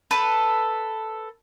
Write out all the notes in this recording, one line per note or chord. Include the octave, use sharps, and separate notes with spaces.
A4 B4